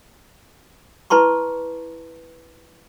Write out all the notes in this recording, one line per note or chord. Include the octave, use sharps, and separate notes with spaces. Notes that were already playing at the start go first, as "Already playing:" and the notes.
E4 B4 A5 C6 C#6